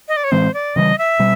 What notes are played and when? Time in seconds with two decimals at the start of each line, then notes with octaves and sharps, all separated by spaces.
0.08 D#5
0.16 D5
0.24 C#5
0.31 A2 E3 G#3 C4 C5
0.54 D5
0.76 C#3 E3 G3 D#5
0.98 E5
1.19 B2 G3